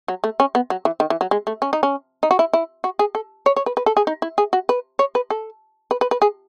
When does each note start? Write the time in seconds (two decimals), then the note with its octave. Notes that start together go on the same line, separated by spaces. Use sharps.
0.08 F#3
0.24 A3
0.40 C#4
0.55 B3
0.70 F#3
0.85 E3
1.00 D#3
1.10 E3
1.21 F#3
1.31 G#3
1.47 A3
1.62 C#4
1.73 D#4
1.83 C#4
2.23 D#4
2.31 F#4
2.39 E4
2.53 E4
2.84 F#4
2.99 G#4
3.15 A4
3.46 C#5
3.56 C#5
3.66 B4
3.77 B4
3.86 A4
3.97 G#4
4.07 D#4
4.22 E4
4.38 G#4
4.53 F#4
4.69 B4
4.99 C#5
5.15 B4
5.30 A4
5.91 B4
6.01 B4
6.11 B4
6.22 G#4